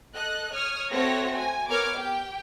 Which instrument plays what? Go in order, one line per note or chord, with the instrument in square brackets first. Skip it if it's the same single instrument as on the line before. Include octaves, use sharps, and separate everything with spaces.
[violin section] A4 D#5 F#6
C#5 D#6 F6
A3 C4 F#4 C#5 A#6
G#5
B3 A#4 C#5 D6 F6 G#6
G4 G5